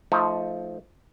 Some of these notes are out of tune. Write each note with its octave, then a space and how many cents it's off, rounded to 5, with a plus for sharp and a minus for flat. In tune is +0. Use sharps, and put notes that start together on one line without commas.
F3 -5 A3 +0 D#4 +25